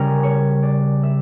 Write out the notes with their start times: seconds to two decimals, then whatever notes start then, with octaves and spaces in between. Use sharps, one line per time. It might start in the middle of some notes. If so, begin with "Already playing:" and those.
Already playing: C#3 G3 C#4 A#4
0.23 C#5
0.63 D5
1.03 E5